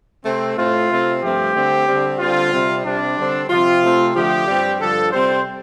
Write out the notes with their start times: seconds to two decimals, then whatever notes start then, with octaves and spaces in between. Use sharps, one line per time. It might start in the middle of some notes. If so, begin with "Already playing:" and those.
0.24 C3 A3 C4
0.56 A2 A3 C4 F4
0.90 C3 A3 C4
1.21 G2 F3 A3 C4 G4
1.54 D3 A3 C4
1.86 D3 G3 C4
2.19 D3 G3 C4 F4
2.52 C3 G3 C4
2.84 C3 G3 C4 D4
3.17 D3 G3 C4
3.49 C3 F3 C4 F4
3.82 C3 A3 C4
4.14 D3 F3 A3 G4
4.47 G2 G3 C4
4.79 G2 D3 F3 A4
5.11 C3 G3 C4 C5